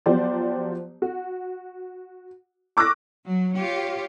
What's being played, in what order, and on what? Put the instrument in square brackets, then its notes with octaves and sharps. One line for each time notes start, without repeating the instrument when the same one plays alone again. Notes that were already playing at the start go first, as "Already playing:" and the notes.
[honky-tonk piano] F3 F#3 B3 G4 C5 D5
F#4
C#6 D6 E6 F#6 A#6
[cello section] F#3
F4 G4 C#5